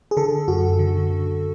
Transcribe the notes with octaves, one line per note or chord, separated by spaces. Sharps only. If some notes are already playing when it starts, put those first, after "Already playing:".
G#4
D3 A4
F#2 F#4
D3
D3